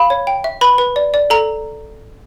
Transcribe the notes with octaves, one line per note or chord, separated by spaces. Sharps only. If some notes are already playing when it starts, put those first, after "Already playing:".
Already playing: F5 B5
C#5
G5
E5
B4 B5
B4
D5
D5
A4 A#5